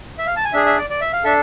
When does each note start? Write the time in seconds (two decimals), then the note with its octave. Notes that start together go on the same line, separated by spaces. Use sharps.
0.19 E5
0.27 F5
0.36 A5
0.45 G#5
0.53 D4 G#4 E5
0.66 E5
0.78 D5
0.90 D5
1.01 E5
1.13 F5
1.24 D4 A4 E5